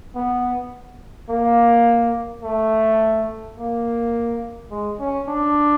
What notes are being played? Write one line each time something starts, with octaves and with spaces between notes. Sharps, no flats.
B3
A#3
A3
A#3
G#3
C#4
D4